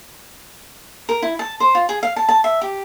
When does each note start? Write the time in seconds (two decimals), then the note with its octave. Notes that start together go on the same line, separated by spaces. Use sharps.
1.09 A#4
1.22 E4
1.39 A5
1.60 C5
1.75 F4
1.89 G#4
2.03 F5
2.16 A5
2.29 A5
2.44 E5
2.61 G4